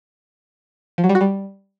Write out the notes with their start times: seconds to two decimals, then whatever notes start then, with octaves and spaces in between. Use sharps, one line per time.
0.98 F3
1.04 F#3
1.09 G3
1.15 F#4
1.21 G3